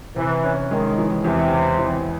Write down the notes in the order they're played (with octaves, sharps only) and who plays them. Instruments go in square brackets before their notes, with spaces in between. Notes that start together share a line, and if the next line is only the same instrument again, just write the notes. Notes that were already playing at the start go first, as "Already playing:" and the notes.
[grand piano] C3 [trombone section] E3
[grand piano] C#4
[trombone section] D#3 [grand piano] G#3
[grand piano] E3
[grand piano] E2 [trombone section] C3
[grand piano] C#3
E2